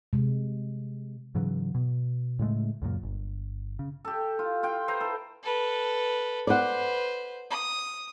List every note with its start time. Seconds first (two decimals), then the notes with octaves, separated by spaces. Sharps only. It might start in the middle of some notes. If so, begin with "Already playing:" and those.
0.13 C3 G#3
1.35 G#2 C#3 E3 F#3
1.75 B2
2.39 A2 C#3 G#3 A3
2.82 C#2 F#2 A#2
3.03 G1
3.79 C#3
4.05 G4 A4
4.39 F4
4.63 F4 G5
4.88 B4 C5 E5 A#5
5.01 A4
5.43 A4 B4
6.47 B4 C5 D5 F#5
7.51 D#6